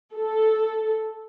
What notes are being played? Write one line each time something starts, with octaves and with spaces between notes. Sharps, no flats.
A4